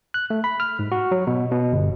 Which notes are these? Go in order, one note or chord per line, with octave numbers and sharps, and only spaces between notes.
F#6
A3
B5
F6
G#2
F#4
F#3
B2
B2
G1